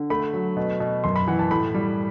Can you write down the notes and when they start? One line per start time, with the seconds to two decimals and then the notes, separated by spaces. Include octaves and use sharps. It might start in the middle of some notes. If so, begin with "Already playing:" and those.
Already playing: D3
0.10 A3 B5
0.33 F#3
0.57 B2
0.80 B2
1.04 F#2 C6
1.16 B5
1.28 E3 F#5
1.39 A5
1.51 A2 B5
1.74 G3